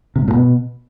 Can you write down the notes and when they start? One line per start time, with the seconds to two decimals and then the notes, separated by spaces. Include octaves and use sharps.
0.16 C3
0.22 G#2
0.28 A2
0.34 B2